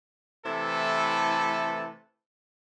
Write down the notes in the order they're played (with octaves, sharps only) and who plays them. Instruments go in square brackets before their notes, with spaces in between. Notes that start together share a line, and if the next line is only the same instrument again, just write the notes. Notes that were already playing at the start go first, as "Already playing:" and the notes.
[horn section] C3 E3 A3 E4 A4 B4